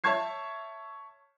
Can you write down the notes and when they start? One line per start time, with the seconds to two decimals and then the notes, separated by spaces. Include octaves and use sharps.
0.04 C#5 E5 A5 C#6 G#6 C7